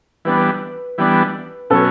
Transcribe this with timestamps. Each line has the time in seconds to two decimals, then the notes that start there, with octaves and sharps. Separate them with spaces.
0.25 E3 G3 B3 D4 B4
0.98 E3 G3 B3 D4
1.70 B2 F#3 C#4 A4